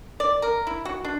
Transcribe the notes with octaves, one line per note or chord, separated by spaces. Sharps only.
D5
A#4
E4
F#4
D4